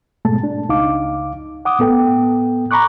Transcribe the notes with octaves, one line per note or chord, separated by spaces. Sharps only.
G#2 B2 G#3 A3 A5
D4
C#2 D#4 F5 D6
F#5 D6 D#6
A2 B3 A4 G5
A#5 B5 C#6 D6 F#6